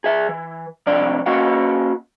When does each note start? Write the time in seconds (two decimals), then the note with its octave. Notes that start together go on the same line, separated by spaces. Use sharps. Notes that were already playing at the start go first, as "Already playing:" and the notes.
0.04 G#4 E5
0.29 E3
0.87 F2 C3 D4 D5 A#5
1.26 A#3 C#4 F#4 D#5 F5 F#5